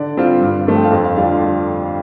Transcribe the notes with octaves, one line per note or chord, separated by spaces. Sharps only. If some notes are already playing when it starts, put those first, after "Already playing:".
Already playing: D3 D5
G3 C4 F4
G2
F3 A3 D4
G5
F5
F2 D5
F5
D3 G3 D4 F4 F5